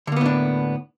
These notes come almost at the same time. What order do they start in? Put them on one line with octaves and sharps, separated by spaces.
D3 A#3 B3 A2 D4